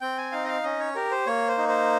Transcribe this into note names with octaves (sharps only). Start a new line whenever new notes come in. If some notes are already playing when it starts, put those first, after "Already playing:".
C4 G5
G#5
D#4 F5
D#5
F5
C#4 D#5
C#5
G4 A#4
C5
A#3 C#5
C5
D#4
C5